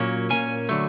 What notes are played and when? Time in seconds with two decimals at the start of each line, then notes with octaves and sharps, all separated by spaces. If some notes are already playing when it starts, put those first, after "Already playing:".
Already playing: A#2 F#3 A#3 C#4
0.30 A#2 F#3 A#3 C#4 G#5
0.69 D3 F#3 A3